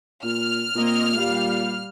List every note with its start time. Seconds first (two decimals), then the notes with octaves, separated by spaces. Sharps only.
0.24 A#2 F6
0.76 A#2 A#3 C4 D#5
1.16 G3 G4 F5